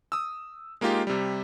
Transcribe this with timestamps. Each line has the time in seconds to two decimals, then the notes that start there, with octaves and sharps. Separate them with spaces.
0.12 D#6 E6
0.81 G#3 A#3 D#4 F4 G4
1.07 C3 G3